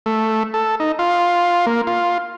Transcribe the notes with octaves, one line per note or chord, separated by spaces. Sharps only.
A3
A4
D#4
F4
A#3
F4